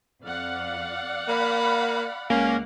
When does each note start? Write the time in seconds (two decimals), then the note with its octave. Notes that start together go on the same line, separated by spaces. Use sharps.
0.23 F2 D5 F5 F#5
1.28 A#3 B5
2.30 C#2 A#3 C#4